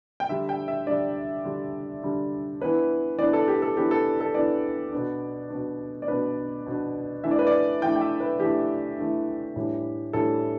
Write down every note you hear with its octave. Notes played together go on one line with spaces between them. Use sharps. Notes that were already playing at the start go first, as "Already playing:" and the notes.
G5
D3 G3 D4 E5
G5
E5
D3 G3 D4 D5
D3 G3 D4
D3 G3 D4
E3 B3 D4 B4
E3 B3 D4 D5
A4
G4
A4
E3 B3 D4 G4
A4
A4
E3 B3 D4 D5
B2 B3 D4
B2 B3 D4
D5
B2 B3 D4 B4
B2 B3 D4
E3 A3 D4 E5
D5
B4
D5
E3 A3 D4 G5
G5
E5
B4
E3 A3 D4 G4
E3 A3 D4
A2 E3 G3 D4
A2 E3 G3 D4 A4